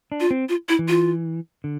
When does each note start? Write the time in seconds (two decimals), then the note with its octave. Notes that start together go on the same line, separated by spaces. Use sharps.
0.12 D4
0.20 F4
0.31 C4
0.49 F4
0.69 E4
0.79 E3
0.88 F4
1.64 D3